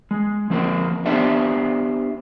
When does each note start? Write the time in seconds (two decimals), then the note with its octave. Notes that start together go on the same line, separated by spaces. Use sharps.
0.11 G#3
0.50 F3 A#3 C4 A#4 C5
1.06 B3 D4 G4 C5 D5 E5